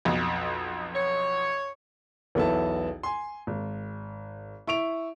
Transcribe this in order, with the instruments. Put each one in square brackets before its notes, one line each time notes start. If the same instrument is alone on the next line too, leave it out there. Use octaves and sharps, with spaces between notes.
[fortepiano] B1 F2
[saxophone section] C#5
[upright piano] B1 E2 B3 E4 A4 A5
G#5 C6
G#1
E4 C#6 D7 F7